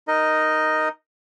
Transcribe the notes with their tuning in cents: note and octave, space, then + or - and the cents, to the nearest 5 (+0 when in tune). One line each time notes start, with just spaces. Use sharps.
D#4 +0 A#4 +0 D#5 +0